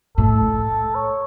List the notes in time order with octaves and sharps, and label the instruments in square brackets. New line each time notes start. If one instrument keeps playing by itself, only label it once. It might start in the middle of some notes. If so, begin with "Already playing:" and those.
[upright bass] A2 [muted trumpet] A4
[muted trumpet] C#5